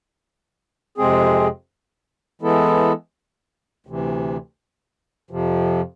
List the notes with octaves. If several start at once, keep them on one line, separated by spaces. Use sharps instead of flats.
F2 C3 G#3 C4 G#4
E3 G#3 B3 E4 A4
D2 C3 E3
F2 C3 F3